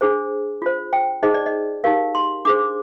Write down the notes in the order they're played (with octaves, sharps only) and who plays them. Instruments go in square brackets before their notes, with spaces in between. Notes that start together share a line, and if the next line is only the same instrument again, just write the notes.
[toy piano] D4 G#4 C5
F4 C5
G5
D#4 G#4 C5 D#5
D5
D#5
D#4 G4 A#4 F5
C6
D4 G#4 C5 D6